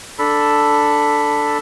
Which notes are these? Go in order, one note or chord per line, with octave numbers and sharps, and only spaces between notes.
D4 A4 B5